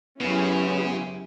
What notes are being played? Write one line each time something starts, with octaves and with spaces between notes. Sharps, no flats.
F#2 C#3 G#3 B3 C#4 E4 G4